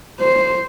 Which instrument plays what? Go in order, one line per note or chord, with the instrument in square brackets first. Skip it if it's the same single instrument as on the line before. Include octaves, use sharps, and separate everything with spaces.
[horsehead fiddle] C5